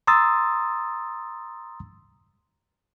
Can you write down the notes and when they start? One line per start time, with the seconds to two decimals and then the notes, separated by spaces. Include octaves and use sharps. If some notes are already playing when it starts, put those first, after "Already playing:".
0.07 A#5 C6 D#6 E6 A6